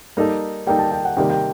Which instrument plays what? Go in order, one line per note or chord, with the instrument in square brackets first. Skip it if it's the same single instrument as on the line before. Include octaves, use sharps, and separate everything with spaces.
[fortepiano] G3 A#3 D#4 A4
[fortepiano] G3 A#3 D#4 A4 [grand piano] G5
[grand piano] A5
G5
F#5
[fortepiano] C3 D#3 G3 A#3 [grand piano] G5
[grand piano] G5